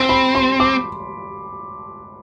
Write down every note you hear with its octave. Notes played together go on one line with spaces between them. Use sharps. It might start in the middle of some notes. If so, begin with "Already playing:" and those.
Already playing: C4 C6
B5
C6
D6